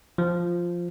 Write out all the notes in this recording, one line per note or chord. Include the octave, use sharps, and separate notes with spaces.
F3